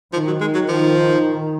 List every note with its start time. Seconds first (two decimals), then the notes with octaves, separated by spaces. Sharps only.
0.13 D#3 F3
0.27 F#3
0.41 G#3
0.54 F#3
0.69 F3